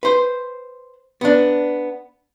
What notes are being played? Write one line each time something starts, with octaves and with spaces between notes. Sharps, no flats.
B4 C5
B3 D4